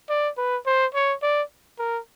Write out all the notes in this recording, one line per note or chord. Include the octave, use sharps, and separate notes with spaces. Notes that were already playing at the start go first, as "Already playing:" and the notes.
D5
B4
C5
C#5
D5
A#4